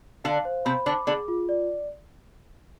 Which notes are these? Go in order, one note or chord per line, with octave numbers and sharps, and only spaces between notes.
D3 D4 F5
C5
C3 C4 B5
D3 D4 D6
D3 D4 G#4
F4
D5